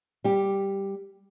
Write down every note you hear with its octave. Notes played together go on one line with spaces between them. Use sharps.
G3 G4